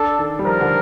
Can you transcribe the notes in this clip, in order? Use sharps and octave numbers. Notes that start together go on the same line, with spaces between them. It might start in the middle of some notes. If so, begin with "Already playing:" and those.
Already playing: D4 A4
D#3
G3
F3 A#4
D3